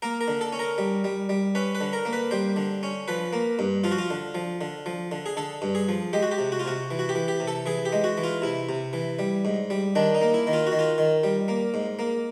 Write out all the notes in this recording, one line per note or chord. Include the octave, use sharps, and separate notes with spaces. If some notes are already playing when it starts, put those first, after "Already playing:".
A#3 A#4
A#4
D3
A4
C#4
A#4
G3
G3
G3
C#4 B4
B4
D3
A#4
A#3
B4
G3 C5
D3
C#4
F3 B4
A#3
G2
F3 F4
F#4
F4
D3
F3
D3
F3
D3
G#4
D3 A4
G2
G#4
F3
G#3 G4
F#4
G4
C3
F#4
F4
C3 F#4
E3
F#4
G4
E3
G4
C3
A4
E3 G#4
G4
G#3
F#4
E3
F4
C3 E4
C3
E3
G3
G#2
G3
D#3 D4
D#4
A#3
E4
D#3
F4
F#4
D#3
F4
D#3
G3
A#3
G#2
A#3